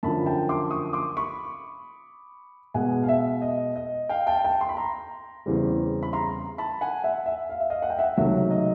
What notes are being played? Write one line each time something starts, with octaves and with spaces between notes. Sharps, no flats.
F#2 D3 F3 A5 B5
G5 A5
C6 D6
C#6 D#6
C6 D6
B5 C#6
B2 G#3 B3 F#5 G#5
F5
E5
D#5
D#5
F5 G5
G5 A5
G5 A5
C6
B5
A#5 C6
E2 C#3 E3 G3 C4
B5
A#5 C6
A5 B5
F#5 G#5
E5 F#5
E5
F5
E5
D#5 F5
F#5
G5
E5 F#5
C#2 C3 D#3 F#3 A3 E5
D#5